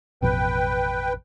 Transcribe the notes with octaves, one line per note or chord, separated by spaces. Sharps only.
A1 F2 B2 B4 G5